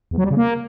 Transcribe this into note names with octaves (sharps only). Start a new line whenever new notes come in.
E2
F#3
G3
C#3
A#3